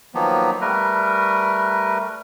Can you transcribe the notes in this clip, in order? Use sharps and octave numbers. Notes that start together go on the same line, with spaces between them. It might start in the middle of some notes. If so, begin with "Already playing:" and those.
D#3 F3 F#3 A#3 B3
G3 A3 A#4 B4